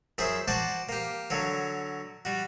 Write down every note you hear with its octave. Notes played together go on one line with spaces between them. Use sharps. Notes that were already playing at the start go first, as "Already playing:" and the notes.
F#2 E4 G#4 C5 E5
F#4 C5 D5 A5 C#6
A#3 G4
D3 F#3 C#5
G3 F#4